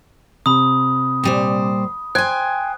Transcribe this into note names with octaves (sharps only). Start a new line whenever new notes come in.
C3 B5 D#6
A#2 G3 C5
C5 G5 G#5 F#6 G#6